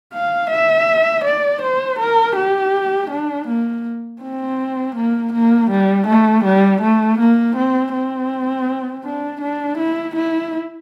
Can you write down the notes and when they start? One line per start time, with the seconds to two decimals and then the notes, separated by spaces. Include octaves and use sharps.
0.13 F5
0.50 E5
1.24 D5
1.62 C5
1.99 A#4
2.36 G4
3.10 D4
3.47 A#3
4.22 C4
4.95 A#3
5.33 A#3
5.70 G3
6.07 A3
6.44 G3
6.82 A3
7.19 A#3
7.56 C4
7.93 C4
9.05 D4
9.41 D4
9.78 E4
10.16 E4